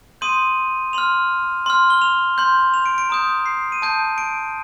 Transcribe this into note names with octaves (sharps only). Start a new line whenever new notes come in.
C6 D#6 G6 D#7
C6 F6 F7
C6 F6
G7
F7
C6 G6
F7
D7
D7
A#5 D#6 G6 D7
C7
D#7
A5 D#6 G6 D7
D7